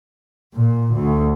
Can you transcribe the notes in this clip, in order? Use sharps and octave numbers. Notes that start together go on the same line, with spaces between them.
A#2
D2